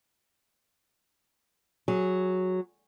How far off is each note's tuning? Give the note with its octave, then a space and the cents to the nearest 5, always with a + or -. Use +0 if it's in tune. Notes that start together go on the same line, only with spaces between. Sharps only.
F#3 -5 G#4 +0